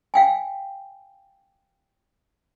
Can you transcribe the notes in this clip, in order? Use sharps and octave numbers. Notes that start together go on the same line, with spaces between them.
F5 G5 G#5